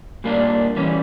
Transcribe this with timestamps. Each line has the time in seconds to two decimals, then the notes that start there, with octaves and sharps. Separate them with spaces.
0.24 A#2 G3 A#3 D4
0.76 E3 G3 C#4